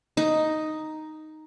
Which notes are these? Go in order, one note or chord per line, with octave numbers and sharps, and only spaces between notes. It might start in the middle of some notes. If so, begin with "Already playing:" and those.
D#4